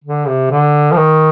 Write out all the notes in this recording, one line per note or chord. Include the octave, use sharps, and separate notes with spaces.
D3
C3
D3
F3
D#3